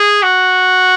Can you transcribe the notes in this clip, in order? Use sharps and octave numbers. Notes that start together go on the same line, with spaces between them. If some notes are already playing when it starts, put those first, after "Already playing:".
Already playing: G#4
F#4